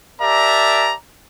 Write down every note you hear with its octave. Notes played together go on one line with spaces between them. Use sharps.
G4 A#4 D5 E5 A5 A#5